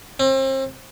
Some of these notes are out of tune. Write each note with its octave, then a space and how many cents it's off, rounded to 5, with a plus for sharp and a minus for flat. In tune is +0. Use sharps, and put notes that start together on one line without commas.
C4 +35